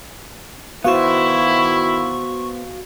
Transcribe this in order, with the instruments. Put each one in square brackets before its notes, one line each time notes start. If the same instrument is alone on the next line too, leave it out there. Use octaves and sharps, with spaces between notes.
[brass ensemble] D#3 E4 [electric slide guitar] B3 C5 [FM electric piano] F#4 F5 [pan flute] C#6